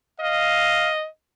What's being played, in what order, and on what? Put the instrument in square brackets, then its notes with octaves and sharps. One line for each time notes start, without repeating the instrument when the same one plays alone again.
[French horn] D#5 [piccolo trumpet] F5